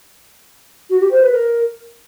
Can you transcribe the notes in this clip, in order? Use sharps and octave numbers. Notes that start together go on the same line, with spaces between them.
F#4
G4
C5
B4
A#4